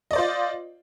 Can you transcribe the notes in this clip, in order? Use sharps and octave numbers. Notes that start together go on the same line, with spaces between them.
F4 C5 D5 D#5